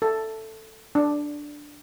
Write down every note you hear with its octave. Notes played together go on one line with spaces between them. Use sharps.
A4
D4